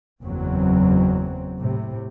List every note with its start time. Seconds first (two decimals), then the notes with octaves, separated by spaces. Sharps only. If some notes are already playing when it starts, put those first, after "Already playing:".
0.22 F#1 E2 F#3 C4
1.61 A2 C3